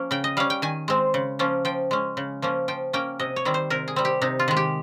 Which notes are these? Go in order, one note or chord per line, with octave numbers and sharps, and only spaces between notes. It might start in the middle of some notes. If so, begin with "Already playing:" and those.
Already playing: F3 A#3 C#4
C#3 G5
D#5
G3 C#4 F5
G5
D#3 G#5
G#3 C4
C#3
F3 A#3 C#4
F3 G5
G#3 C#4
C#3
F3 A#3 C#4
F3 G5
A#3 C#4 G5
C3 D#5
C#5
D#3 G3 C4
C5
C3 A#4
G#4
G3 C4
G4
C3 D#4
F4
D#3 G#3
G4